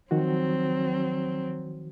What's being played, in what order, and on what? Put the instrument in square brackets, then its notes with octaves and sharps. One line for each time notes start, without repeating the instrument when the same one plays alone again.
[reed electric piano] D#3 F3 F#4 [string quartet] F#3 C4